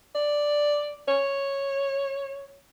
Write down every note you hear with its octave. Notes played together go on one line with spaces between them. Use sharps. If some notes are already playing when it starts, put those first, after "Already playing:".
D5
C#5